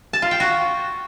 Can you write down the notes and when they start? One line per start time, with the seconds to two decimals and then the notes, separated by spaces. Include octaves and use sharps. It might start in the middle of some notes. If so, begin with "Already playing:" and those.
0.13 A5
0.22 F4
0.31 G5
0.40 F#4